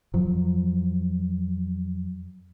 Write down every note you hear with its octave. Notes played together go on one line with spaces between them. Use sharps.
F2 F3 F#3